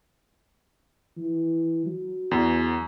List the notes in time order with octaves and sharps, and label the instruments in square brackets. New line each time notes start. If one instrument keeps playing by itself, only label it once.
[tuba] E3
F#3
[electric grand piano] E2